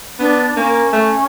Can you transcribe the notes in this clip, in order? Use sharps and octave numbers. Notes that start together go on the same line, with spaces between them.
B3 D4
A#3 C#4
A3